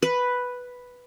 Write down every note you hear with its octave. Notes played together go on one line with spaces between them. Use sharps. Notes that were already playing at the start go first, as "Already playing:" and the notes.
B4